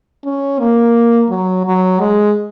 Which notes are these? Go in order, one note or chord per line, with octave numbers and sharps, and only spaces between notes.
C#4
A#3
F#3
F#3
G#3